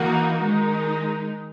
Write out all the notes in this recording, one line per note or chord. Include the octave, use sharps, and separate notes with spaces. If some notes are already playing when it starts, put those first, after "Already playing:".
Already playing: E3 A#3 D#4 F#4
D#3 G#3 D#4